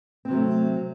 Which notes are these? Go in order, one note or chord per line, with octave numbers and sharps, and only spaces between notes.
C3 F#3 A3 C4